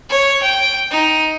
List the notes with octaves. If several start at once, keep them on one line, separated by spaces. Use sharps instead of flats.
C#5
G5
D#4